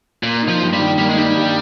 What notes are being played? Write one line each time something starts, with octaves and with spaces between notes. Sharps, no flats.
A#2 A#3
D#4
F3
G2
G3
D#3
G3 A#3
G#3
G3 D#4
G2